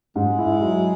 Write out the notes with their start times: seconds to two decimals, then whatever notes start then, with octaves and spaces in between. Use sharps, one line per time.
0.16 G#2 G#3
0.38 E4
0.61 F#3